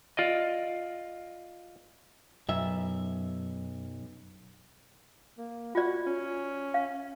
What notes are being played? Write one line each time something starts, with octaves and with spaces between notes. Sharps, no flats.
F4 D5 D#5
B1 F#2 E5
A#3
F4 F#4 D5
C#4
F5